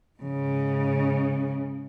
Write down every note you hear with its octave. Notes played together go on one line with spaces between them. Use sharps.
G#2 C#3